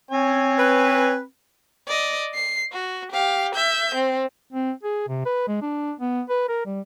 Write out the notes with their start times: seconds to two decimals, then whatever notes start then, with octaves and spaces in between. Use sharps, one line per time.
0.11 C4 C#5 G#5
0.57 B4
1.88 D5 D#5
2.35 C7
2.73 F#4
3.12 G4 F5
3.55 E5 G6
3.95 C4
4.52 C4
4.83 G#4
5.08 C3
5.26 B4
5.48 G#3
5.62 D4
6.00 B3
6.29 B4
6.48 A#4
6.66 G3